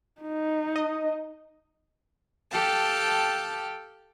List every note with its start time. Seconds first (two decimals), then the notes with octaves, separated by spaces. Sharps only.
0.21 D#4
0.76 D#5
2.49 G4 A4 F5 G5 A5